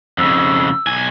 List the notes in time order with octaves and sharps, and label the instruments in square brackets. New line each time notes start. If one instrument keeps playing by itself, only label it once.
[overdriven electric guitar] F2 C#3 [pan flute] E6
[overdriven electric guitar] B1 G#5